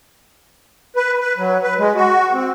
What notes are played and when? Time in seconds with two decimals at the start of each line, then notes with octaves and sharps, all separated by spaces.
0.96 B4
1.20 B4
1.38 F#3
1.63 B4
1.79 G#3
1.95 F#4
2.33 C4